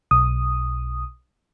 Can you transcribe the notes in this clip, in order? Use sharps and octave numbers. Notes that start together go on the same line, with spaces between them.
B1 D#6